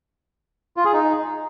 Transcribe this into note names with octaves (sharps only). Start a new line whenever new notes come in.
F4
G#4
D#4